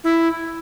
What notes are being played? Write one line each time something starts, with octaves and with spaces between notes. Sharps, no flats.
E4